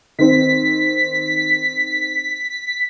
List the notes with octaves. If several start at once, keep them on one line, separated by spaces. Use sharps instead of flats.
D#3 C4 B6